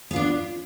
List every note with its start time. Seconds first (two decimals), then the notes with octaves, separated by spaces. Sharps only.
0.11 B3
0.13 F4
0.16 D4